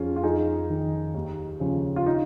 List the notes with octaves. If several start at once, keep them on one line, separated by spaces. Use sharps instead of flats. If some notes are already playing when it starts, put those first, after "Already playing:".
Already playing: F2 C#4 F4 G#4
F4
F2 D#4 G#4
D#3
D#2
C#3 F3
F4
D#4